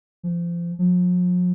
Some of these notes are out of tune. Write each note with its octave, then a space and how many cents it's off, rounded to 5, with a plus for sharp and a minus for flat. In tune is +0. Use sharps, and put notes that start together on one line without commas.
F3 -30
F3 +45